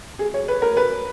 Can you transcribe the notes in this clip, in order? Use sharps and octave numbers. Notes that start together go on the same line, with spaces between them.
G#4
C#5
B4
A#4
B4